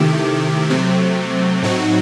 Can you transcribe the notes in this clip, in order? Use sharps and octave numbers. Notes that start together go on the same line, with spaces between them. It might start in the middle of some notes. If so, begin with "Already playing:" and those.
Already playing: C3 D#3 A3 E4 G4
C3 F#3 A3 C4
A2 F#3 C4 D#4 F#4